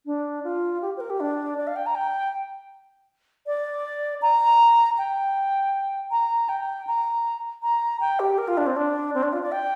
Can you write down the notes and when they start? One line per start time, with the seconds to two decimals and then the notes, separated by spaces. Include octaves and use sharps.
0.06 D4
0.44 F4
0.82 G4
0.97 C5
1.00 A#4
1.10 G4
1.20 D4
1.58 D5
1.67 F5
1.76 G5
1.86 A#5
1.95 G5
3.46 D5
4.22 A#5
4.98 G5
6.11 A#5
6.49 G5
6.87 A#5
7.63 A#5
8.00 G5
8.20 G4
8.38 A#4
8.48 F4
8.57 D4
8.66 C4
8.76 D4
9.14 C4
9.23 D4
9.33 F4
9.42 D5
9.52 G5